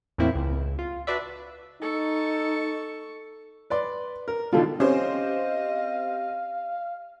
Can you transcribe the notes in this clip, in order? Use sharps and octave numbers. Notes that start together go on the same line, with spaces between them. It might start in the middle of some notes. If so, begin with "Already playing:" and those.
E2 A2 A#3 C4 E4
C#2
F4
D4 F#4 B4 D5 E5
D#4 A4 C#6
B4 D5 C6
A#4
B2 D3 D#3 F4 A4
C4 C#4 G4 C5 D#5 F5